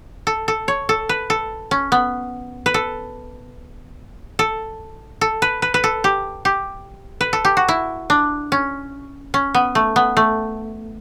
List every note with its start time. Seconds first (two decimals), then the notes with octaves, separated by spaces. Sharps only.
0.27 A4
0.48 A4
0.68 C#5
0.89 A4
1.09 B4
1.30 A4
1.71 C#4
1.92 B3
2.66 B4
2.74 A4
4.39 A4
5.21 A4
5.42 B4
5.62 B4
5.74 B4
5.84 A4
6.04 G4
6.45 G4
7.21 B4
7.33 A4
7.45 G4
7.57 F#4
7.68 E4
8.10 D4
8.52 C#4
9.34 C#4
9.54 B3
9.75 A3
9.96 B3
10.17 A3